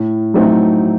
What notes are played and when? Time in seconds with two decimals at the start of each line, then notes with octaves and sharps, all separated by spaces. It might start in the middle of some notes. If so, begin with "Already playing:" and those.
Already playing: A2
0.34 F#3 A3 C4 D#4